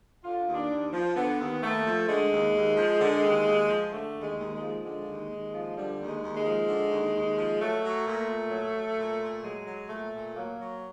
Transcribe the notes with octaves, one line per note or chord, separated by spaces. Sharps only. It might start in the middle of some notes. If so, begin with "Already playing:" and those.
D3 F4
D#2
D4
D#2
F3
D3 B3
D#2
D#2 A3
F3
D3 G#3
D#2
D#2
F3
D3
D#2
D#2
F3
D3 A3
D#2
G#3
D#2
G#3
F3
D3 G#3
D#2
D#2
F3
D3 G3
D#2
G#3
D#2
G#3
F3
D3
D#2
D#2
F3
F#3 A3
F#3
A#2
A#2
F#3
F#3
A#2
A#2
F#3 G#3
F#3
A#2 A3
A#2
F#3 A#3
F#3